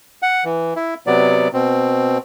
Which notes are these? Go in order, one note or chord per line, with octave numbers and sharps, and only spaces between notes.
F#5
E3
E4
C3 F#3 B3 D5
B2 C4